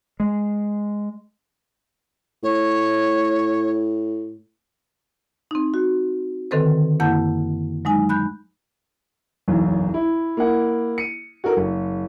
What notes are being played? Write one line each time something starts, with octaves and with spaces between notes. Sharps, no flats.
G#3
A2 C#5
C4 D#4
F#4
D3 D#3 C4 A4 B4 C5
F#2 A#3 E4 F#5 A5 G6
F#3 G#3 D#4 G#5
B5 F#6 G6
F#1 B1 E2
E4
A#3 E4 F#5
C#7 D#7
F#4 A4 A#4
F#1